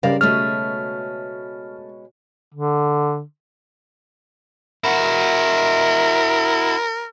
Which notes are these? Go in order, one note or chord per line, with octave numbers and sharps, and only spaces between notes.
C#3 G3 C4 A#4 D5 F5
B2 G#3 A3 C#4 A4 F6
D3
E4 F#4 A#4